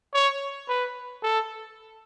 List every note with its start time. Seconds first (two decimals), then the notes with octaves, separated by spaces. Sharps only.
0.14 C#5
0.69 B4
1.23 A4